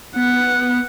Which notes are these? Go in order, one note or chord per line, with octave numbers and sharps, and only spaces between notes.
B3 F#5